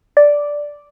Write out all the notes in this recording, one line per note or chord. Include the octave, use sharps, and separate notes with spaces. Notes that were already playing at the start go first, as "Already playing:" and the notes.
D5